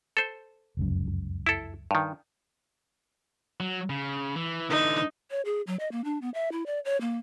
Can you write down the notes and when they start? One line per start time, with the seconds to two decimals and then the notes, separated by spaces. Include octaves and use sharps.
0.17 A4 C5
0.77 F1 C#2 F#2
1.46 E4 A4
1.91 G2 D#3
3.60 F#3
3.90 C#3
4.36 E3
4.70 D3 E3 D#4
5.31 C#5
5.45 G#4
5.67 F#3
5.80 D#5
5.92 A#3
6.04 D4
6.22 B3
6.34 E5
6.52 E4
6.66 D5
6.85 C#5
7.01 A#3